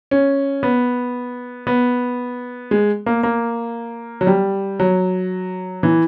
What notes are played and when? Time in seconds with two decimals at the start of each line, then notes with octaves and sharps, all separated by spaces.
0.11 C#4
0.63 B3
1.67 B3
2.71 G#3
3.06 A#3
3.23 A#3
4.21 F#3
4.27 G3
4.80 F#3
5.83 E3